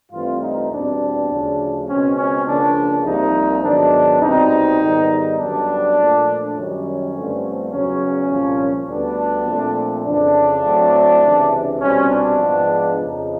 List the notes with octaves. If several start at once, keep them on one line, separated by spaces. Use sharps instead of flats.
G2 E3 A3 C4 F4
D#4
E2 B2 G3 C4 D4
D2 C#3 F3
C#2 B2 G#3 C4 C#4
C#4
C#2 C#3 F3 A#3 D4
C2 C3 F3 A#3 D#4
G#2 D#3 F#3 B3 D4
C2 B2 G3 C4 D#4
G#2 D#3 G3 B3
F#2 D3 G3 B3 D4
A#2 F3 A3
F#2 D#3 G3 C#4
G2 D3 F3 A3 C4
E2 C#3 F#3 C#4
C2 A#2 F3 A#3
D2 D3 G3 B3 D4
A#2 F3 A3 C4
F2 C#3 E3 D4
A2 F#3 A3 C4
C#2 C3 E3
C2 B2 G3 C4 C#4
D4
G#2 F3 G#3 B3
F2 C#3 F3 D#4